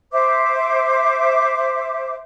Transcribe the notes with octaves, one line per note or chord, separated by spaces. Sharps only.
C5 E5 D6